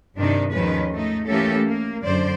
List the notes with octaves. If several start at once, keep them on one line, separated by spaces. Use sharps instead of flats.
G2 C3 D#3 D4 D#4
D#2 G#2 D#3 F3 C#4 B4
A3 D#4
E3 A3 A#3 C#4 G4 A4
A#3
F#2 D3 C5 D5